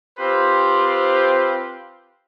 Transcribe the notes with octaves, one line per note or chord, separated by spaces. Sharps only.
C4 F4 G4 B4 C5